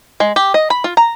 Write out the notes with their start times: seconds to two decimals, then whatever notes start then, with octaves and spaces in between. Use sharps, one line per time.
0.20 G#3
0.36 G4
0.54 D#5
0.70 B5
0.84 F4
0.97 A#5